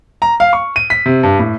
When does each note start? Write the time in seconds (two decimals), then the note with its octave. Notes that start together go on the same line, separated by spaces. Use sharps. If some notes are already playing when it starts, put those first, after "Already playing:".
0.22 A#5
0.40 F5
0.53 C#6
0.76 D#7
0.90 B6
1.06 C3
1.23 G2
1.39 A2